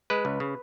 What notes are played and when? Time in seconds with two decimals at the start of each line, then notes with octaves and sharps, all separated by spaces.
0.10 G#3 B4
0.25 C#2
0.40 C#3